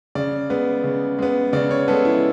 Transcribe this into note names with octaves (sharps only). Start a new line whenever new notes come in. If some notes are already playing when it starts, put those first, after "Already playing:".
C#3 D5
G#3 B3
C#3
G#3 B3
C#3 D5
C#5
G#3 B3 A4
E4